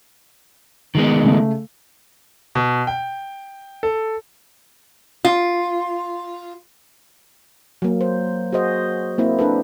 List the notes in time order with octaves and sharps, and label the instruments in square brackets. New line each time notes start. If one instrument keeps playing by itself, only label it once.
[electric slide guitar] D#3 G#3 B3
[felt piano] C#3 A3
[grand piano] B2
G5
A4
[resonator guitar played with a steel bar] F4
[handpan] F#3 A#3
C5
F#4 G#4 C5 D#5
A#3 C4 E4
D4 A4 B4